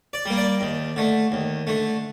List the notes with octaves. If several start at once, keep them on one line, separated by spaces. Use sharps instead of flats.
D5
G3 A#3
D5
D#2
D3 A3
D#2
D3 A3